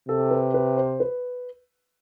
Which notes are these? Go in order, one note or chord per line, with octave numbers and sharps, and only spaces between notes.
C3 A4
B4
B4
C5
B4